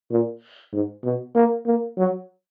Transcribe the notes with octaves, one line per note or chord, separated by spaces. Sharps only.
A#2
G#2
B2
A#3
A#3
F#3